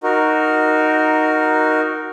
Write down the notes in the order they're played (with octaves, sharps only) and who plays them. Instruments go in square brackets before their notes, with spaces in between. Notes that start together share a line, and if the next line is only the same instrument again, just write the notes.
[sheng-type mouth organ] D#4 F#4 A#4